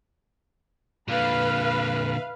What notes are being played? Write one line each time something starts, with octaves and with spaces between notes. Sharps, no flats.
A#2 D3 B4 F5